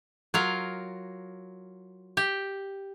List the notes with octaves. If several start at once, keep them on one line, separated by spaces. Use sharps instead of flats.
F#3 F4 A#4
G4